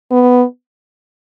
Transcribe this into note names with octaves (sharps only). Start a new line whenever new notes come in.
B3